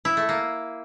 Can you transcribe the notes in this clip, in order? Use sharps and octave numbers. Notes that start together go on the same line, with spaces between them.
E4
A3
A#3